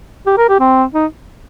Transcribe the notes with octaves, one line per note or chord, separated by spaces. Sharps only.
G4
A#4
G4
C4
D#4